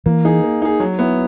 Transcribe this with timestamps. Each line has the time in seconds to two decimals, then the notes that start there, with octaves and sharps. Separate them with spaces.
0.06 E3 A#3
0.25 D#4 G#4
0.43 A#3
0.62 D#4 G#4
0.80 F#3
0.99 B3 E4